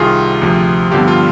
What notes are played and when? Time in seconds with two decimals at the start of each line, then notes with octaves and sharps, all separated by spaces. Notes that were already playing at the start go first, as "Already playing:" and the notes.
Already playing: C2 C3 D#3 F4 G#4
0.42 D2 C3 F3
0.92 G2 D3 F3 B3 G4
1.08 F4